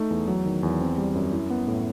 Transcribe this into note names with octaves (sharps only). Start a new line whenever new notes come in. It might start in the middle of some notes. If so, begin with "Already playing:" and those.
Already playing: A3 D#4
E2
F#3
D#3
E2
C4
G3
F#2
E4
B3
A2